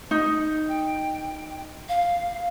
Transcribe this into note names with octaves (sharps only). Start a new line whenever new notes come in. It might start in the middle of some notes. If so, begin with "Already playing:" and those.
D#4
G5
F5